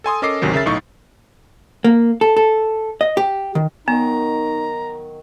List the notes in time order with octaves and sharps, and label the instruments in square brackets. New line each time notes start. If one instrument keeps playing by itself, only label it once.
[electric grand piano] A4 G#5 C6 D#6
C#4 A4 A#4 D#5 D6 C7
G#1 D2 C3 D#3 F#3
C#3 A#4 E5 A6
B1 A2 D#4 C#6
[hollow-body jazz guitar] A#3
A4
A4
D#5
G4
D#3
[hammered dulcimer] D#3 F#3 [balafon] B3 [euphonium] D#4 [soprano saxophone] A#5